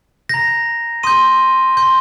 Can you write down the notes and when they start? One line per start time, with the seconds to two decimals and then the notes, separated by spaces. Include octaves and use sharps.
0.29 A#5 G6 A#6
1.03 C6 D#6 G6 D#7
1.77 C6 G6